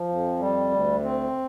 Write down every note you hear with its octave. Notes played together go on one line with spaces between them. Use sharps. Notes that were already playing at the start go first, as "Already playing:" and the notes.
Already playing: F3
F2
G3
D2
C4